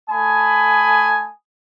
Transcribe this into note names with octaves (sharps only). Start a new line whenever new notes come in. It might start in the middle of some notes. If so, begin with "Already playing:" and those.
A3 G#5 A5 B5 D#6